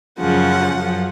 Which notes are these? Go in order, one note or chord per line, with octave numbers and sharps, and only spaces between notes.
F#2 C#3 F3 F#5
F#2 F3